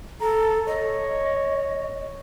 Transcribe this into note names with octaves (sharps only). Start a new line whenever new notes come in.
A4 A#5
C#5 D#5